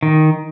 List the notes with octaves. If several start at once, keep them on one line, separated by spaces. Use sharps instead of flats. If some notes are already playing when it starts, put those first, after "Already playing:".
D#3